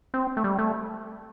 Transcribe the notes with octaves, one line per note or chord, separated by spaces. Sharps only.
C4
A3
G3
A3